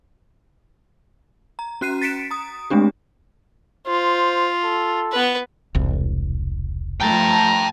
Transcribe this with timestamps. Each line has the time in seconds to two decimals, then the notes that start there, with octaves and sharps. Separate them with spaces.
1.59 A#5
1.81 C#4 F#4 F#6 C7 D#7
2.02 A6 B6 C#7 D7 E7
2.31 A#5 D#6
2.70 G#3 A3 C4 D4 G4
3.87 F4 C5
4.64 A4
5.12 B3 B4
5.75 E1 C2
7.00 F3 A3 G5 A5 A#5